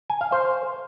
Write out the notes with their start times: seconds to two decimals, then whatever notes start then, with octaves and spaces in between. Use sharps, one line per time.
0.10 G#5
0.21 F5
0.32 C5